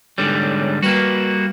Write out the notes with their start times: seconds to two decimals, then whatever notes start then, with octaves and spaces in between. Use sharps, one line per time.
0.18 G#2 D3 G3 C#5
0.83 G3 A#3 F#4 B4 E7